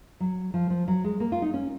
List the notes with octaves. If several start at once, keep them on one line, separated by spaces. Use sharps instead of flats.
F#3
F3
F3
F#3
G#3
A#3
F4
D#4
C#4